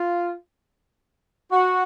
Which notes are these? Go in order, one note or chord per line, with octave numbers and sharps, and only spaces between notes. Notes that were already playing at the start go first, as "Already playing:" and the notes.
Already playing: F4
F#4